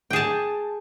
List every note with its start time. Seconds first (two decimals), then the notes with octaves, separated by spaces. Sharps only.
0.10 G5
0.13 G#4
0.16 A5